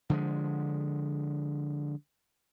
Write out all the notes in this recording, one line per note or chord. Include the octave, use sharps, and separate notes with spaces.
D3 F3 G#3